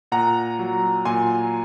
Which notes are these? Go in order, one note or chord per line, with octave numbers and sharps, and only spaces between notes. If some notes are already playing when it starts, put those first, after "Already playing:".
A#2 F#5 A#5
F#3
A#2 G#5 C6